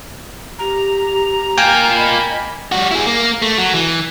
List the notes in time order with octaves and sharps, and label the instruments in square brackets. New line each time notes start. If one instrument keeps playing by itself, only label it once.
[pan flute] G4 [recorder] A#5
[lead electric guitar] A#3 F4 [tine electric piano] G5 G#5
[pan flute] D#5 [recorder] B5
[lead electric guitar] G3 F#4
E4 G#4
A#3
A3
F#3
E3